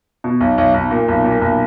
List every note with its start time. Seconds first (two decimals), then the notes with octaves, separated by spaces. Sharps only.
0.24 B2
0.40 B1
0.58 B1
0.74 B1
0.91 A#2
1.08 B1
1.24 A#2
1.41 B1